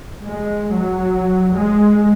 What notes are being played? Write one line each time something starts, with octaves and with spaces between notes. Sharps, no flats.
G#3
F#3
G#3